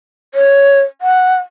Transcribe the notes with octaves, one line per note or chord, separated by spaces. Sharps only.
C#5
F#5